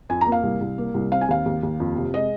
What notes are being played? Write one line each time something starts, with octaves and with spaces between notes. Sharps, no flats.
F2 G#5
A#5
A#3
F5
C2
C2
A#3
C2
C4 F5
G#5
D#2 F5
D#2
D#2
F2
C3
G#3 D#5